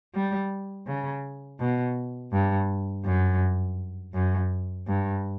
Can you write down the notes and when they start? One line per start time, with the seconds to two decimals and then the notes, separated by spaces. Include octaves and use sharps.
0.14 G3
0.87 C#3
1.59 B2
2.32 G2
3.05 F#2
4.14 F#2
4.87 G2